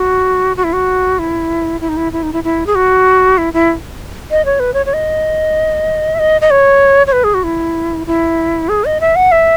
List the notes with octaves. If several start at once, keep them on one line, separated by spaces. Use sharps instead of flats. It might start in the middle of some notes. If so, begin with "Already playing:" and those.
Already playing: F#4
F#4
E4
F#4
E4
E4
D#4
E4
E4
D#4
E4
E4
G#4
F#4
E4
E4
D#5
C#5
B4
C#5
C#5
D#5
E5
D#5
D#5
C#5
C#5
B4
G#4
F#4
E4
E4
G#4
D#5
E5
F#5
E5